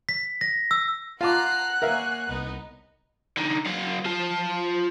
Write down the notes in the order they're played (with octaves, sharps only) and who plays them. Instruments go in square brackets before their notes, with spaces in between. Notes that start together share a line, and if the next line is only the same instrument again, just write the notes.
[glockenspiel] B6
A#6
E6
[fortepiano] F4 A5 D6 [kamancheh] F#5 F#6 [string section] A#5 C7
[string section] A#3 C#5 G#5 [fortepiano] A#4 E5 F5
[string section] C2 B3 D#4
[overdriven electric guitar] D3 D#4
F#3 F5
F4 A5